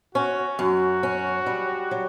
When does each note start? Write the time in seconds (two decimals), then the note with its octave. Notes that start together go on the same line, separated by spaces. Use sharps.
0.15 C#4 F#4
0.59 F#2 F#4
1.03 C#4
1.46 G3
1.91 F#3